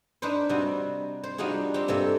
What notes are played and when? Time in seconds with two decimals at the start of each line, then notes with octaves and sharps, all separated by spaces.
0.22 D4 D#4 B4 C5
0.49 C3 G3 D#4 F#4
1.23 C5
1.38 G3 D4 D#4 F4 F#4 G#4
1.74 C4 G4
1.88 G2 C3 A#3 A4 E5